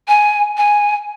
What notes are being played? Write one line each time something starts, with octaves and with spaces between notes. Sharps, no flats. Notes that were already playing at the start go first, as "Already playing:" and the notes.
G#5
G#5